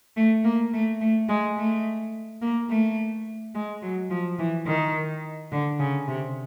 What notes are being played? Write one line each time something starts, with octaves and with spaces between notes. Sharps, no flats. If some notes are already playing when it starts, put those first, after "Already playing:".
A3
A#3
A3
A3
G#3
A3
A#3
A3
G#3
F#3
F3
E3
D#3
D3
C#3
C3